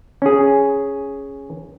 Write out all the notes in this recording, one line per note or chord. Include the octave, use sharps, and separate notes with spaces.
C#4 G#4